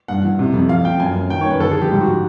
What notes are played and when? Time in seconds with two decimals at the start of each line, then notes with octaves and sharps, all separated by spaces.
0.08 G2 F#5
0.24 E3
0.39 C3
0.54 F2
0.69 F3 F5
0.85 F3 G5
1.00 F#2 G#5
1.16 F#2
1.30 D#3 G5
1.41 C#5
1.46 F#2 B4
1.60 D3 A4
1.71 G#4
1.77 F3 G4
1.91 G#2 G4
2.01 F#4
2.06 F3